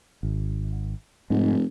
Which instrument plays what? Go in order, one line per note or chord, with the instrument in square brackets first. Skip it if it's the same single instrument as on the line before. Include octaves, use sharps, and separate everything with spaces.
[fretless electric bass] G#1
[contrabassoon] F1 [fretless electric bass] G#2